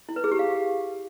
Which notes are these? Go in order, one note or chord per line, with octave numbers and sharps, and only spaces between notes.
E4
B4
G#4
G4
F5